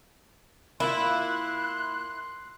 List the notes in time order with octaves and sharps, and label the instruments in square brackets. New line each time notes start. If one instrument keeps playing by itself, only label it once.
[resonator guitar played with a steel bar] A#3 F4 [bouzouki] E4 [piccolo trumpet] C6 [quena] F#6